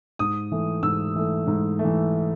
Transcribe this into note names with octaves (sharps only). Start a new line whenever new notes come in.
G#2 D#6
E3 A3
G#2 E6
E3 A3
G#2
A3
E3